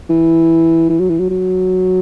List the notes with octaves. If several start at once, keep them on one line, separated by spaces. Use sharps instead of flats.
E3
E3
F#3
E3
F#3
F#3